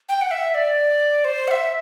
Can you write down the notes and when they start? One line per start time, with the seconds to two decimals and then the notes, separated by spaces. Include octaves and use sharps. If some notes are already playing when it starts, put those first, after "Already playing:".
0.09 G5
0.21 F#5
0.31 E5
0.55 D5
1.25 C5
1.48 F#5
1.51 E5